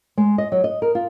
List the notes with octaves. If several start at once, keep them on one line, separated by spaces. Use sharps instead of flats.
G#3
D#5
F#3
D#5
A#4
F4